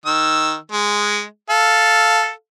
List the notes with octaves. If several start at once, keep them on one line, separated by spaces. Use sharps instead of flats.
D#3 E6
G#3
A4 F5